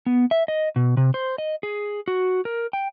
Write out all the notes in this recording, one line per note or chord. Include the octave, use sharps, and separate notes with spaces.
B3
E5
D#5
B2
C3
C5
D#5
G#4
F#4
A#4
G5